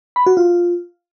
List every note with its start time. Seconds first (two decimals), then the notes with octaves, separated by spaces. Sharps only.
0.16 B5
0.26 F#4
0.37 F4